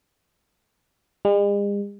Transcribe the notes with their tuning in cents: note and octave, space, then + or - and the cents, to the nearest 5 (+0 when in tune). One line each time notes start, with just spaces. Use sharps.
G#3 -45